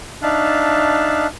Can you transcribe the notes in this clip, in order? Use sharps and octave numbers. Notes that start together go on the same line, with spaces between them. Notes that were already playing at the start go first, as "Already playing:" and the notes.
D4 D#4 E5 F5 A5 F#6